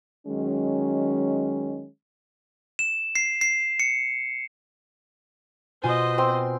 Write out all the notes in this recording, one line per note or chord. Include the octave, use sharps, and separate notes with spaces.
D#3 F#3 G#3 C#4
E7
C7
C7
C#7
B2 F4 C5 D#5 G#5
C4 C6